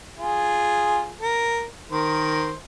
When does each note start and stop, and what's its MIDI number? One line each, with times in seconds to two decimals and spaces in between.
0.18 1.11 65
0.18 1.11 68
1.21 1.65 70
1.92 2.54 51
1.92 2.54 70
1.92 2.54 72